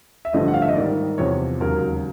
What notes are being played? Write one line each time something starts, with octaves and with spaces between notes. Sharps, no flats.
E5
A1 G2 D3 F3 A3 D#5
F#5
F5
E5
D#5
G#2 D#3 G3 D5
E2 C3 F3 C#5
E1 D#2 C#3 F#3 A#4